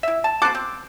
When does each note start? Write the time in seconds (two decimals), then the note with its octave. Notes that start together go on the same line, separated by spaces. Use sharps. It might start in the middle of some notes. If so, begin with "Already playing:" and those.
0.03 E4 E5
0.24 A5
0.42 A4 C5 D6 F#6
0.55 C4